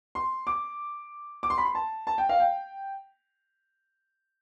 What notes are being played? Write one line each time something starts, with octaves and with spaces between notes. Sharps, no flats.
C6
D6
D6
C6
B5
C6
A5
A5
G5
F5
G5